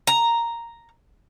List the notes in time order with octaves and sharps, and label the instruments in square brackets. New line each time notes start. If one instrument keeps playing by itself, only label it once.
[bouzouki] A#5